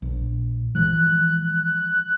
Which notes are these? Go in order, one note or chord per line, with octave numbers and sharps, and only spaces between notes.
A#1
E3 F3 G#3 F#6